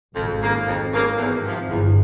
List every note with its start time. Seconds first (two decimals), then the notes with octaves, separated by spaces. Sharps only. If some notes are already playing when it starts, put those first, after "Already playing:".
0.15 G#1 F2 G#2
0.41 C#3 F3 A#3
0.66 G#1 F2 G#2
0.92 C#3 F3 A#3
1.18 E2
1.43 C3 F3
1.68 G1 E2 G2